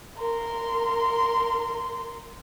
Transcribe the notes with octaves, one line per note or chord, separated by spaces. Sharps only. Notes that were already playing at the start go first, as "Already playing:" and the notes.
A#4 C6